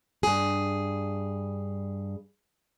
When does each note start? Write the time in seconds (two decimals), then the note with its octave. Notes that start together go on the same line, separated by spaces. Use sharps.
0.23 G2 G#4